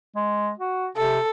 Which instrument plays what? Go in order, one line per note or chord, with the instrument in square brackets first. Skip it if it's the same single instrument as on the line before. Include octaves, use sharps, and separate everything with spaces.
[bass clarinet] G#3
F#4
[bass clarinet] C3 [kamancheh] A4